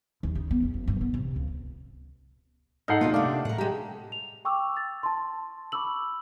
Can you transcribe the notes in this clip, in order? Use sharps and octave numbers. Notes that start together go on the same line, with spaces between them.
D#2
C#3
B3
E2
F#1
G2
B3
C3
C#2
G#2 D#4 A4 F#5 F6 G6 C7
D2 B2 A3 A#3 F4
C3 A3 D4 D#5 F5 D6
A2 A#4 F#5
G#3 G4 G5 A#5
F7
G5 C#6 D6 E6
A6
A5 C6
B5 C#6 D6 E6 F#7